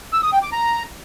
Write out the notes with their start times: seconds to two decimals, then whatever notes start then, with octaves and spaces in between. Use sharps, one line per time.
0.13 E6
0.23 D#6
0.33 G5
0.42 D6
0.52 A#5